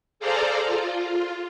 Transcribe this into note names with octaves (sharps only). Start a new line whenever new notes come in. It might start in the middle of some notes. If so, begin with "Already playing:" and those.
G#4 A4 C5 D5 F5 A#5
F4